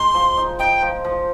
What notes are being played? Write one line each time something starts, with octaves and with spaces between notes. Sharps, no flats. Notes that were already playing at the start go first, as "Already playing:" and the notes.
Already playing: G#3 D#4 C6
F3
D#4
D#4 G5
F3
F3